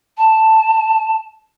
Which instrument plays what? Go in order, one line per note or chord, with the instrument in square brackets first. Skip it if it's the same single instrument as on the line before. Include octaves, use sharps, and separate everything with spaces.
[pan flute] A5